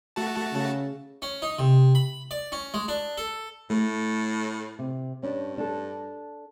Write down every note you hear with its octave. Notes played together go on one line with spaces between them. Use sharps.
A3 F#4 A5
C#3
C#4
D#4
C3
B5
D5
C#4
G#3
D4
A4
A2 A3
C3
G2 C#4 D4
D4 A4